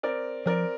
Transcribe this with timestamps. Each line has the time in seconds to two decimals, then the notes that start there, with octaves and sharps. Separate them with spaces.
0.03 C4 A#4 D5
0.46 F3 C4 A#4 D5